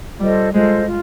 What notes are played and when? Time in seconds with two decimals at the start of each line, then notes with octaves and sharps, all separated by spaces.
0.20 G3 F4 A4 C5 D#5
0.53 G#3 F4 A4 C5 D#5
0.87 F4